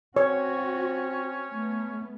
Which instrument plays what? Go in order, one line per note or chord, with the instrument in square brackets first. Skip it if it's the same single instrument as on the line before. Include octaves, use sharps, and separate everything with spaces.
[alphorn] C4 [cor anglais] C#4 [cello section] F#4 [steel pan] C#5
[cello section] A3 B3